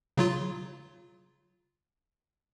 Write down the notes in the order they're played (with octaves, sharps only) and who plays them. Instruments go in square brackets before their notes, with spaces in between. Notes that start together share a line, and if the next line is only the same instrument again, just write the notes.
[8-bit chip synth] C#3 F#3 F4